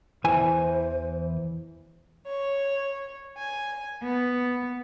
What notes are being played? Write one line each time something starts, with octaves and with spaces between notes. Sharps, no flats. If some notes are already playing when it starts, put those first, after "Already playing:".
E2 E3 C5 G#5
C#5
G#5
B3